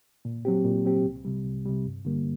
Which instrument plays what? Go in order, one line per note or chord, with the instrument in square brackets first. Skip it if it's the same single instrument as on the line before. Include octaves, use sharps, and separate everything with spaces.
[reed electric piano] A#2
F#3 C4 G4
A#2
F#3 C4 G4
C2
C3 G3
C2
C3 G3
G2
D3 G3 A#3